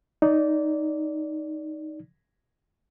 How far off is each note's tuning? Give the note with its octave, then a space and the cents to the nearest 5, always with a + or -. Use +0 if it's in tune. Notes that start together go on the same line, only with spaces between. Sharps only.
D#4 +0 D5 -20